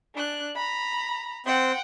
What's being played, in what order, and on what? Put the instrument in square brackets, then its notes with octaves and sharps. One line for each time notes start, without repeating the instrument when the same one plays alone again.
[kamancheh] D4 F#6
A#5 B5
[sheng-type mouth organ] C4 C5 [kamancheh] F#5 G5